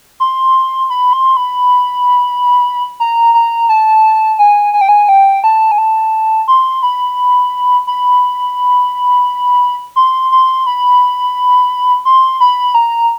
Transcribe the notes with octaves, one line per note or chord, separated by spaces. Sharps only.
C6
B5
C6
B5
A#5
A#5
A5
G#5
G#5
G5
G#5
G5
A5
G#5
A5
C6
B5
B5
C6
C6
B5
C6
B5
A#5